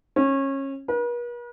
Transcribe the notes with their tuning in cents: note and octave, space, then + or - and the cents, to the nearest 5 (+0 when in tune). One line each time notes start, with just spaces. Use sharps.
C#4 -25
B4 -45